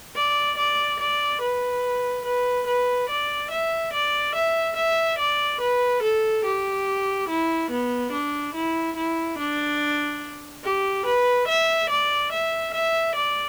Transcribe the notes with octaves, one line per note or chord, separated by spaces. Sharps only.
D5
D5
D5
B4
B4
B4
D5
E5
D5
E5
E5
D5
B4
A4
G4
E4
B3
D4
E4
E4
D4
G4
B4
E5
D5
E5
E5
D5